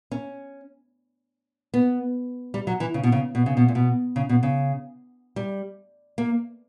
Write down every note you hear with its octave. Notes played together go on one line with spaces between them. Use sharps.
C#4
B3
G3
F#3
E3
C#3
B2
C#3
B2
C#3
B2
A#2
B2
C#3
B2
C#3
G3
A#3